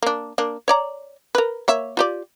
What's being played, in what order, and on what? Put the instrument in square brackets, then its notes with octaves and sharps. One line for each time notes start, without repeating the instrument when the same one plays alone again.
[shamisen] A#3 D4
A#3 D4
C#5 D5 A#5
A#4 B4
A#3 C#5 E5
F4 G4 D5